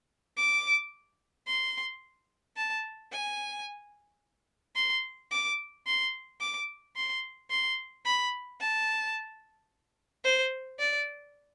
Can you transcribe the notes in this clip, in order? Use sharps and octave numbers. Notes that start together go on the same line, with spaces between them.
D6
C6
A5
G#5
C6
D6
C6
D6
C6
C6
B5
A5
C5
D5